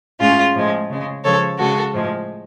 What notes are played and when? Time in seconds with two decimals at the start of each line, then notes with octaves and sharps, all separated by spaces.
0.20 A2 G#3 C#4 F4
0.55 A2 F3 G#3
0.89 C#3 G#3
1.24 C#3 F3 G#3 A4 C#5
1.58 C#3 G#3 F#4 A4
1.93 A2 F3 G#3